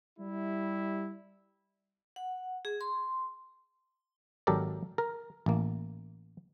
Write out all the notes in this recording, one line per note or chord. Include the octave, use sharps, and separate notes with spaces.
G3 E4
F#5
G#4
C6
G#1 F#3 G4 A4 A#4 D5
A#4
A1 A#3